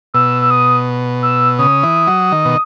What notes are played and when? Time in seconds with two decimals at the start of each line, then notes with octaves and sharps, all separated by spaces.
0.14 B2 E6
0.42 E6
0.50 D#6
1.22 E6
1.59 C#3 D#6
1.83 E3
2.07 F#3
2.32 D#3
2.45 B2